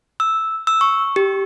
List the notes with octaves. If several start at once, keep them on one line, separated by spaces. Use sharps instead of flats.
E6
E6
C#6
G4